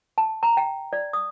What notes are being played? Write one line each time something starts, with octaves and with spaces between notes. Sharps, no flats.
A5
A#5
G5
D5
D#6